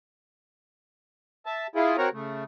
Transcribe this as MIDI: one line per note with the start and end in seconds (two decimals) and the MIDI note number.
1.46 1.67 76
1.46 1.67 81
1.75 1.97 64
1.75 1.97 65
1.75 1.97 68
1.98 2.09 60
1.98 2.09 66
1.98 2.09 70
1.98 2.09 73
1.98 2.09 82
2.13 2.44 49
2.13 2.44 57